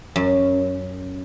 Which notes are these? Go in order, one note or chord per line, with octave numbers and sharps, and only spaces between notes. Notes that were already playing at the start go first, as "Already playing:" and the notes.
F#2